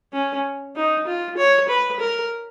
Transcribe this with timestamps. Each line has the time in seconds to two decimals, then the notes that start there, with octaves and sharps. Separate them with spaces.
0.13 C#4
0.76 D#4
1.07 F4
1.37 C#5
1.69 B4
2.00 A#4